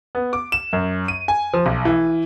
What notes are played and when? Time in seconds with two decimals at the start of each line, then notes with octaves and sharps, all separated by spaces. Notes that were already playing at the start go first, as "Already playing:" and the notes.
0.15 B3
0.33 D6
0.52 E7
0.73 F#2
1.08 D#7
1.28 G#5
1.54 F3
1.66 B1
1.85 E3